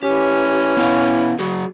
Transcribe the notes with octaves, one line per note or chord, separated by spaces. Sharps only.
E3 C#4 G4
B3 E4 F5
F#3 F#4 G#4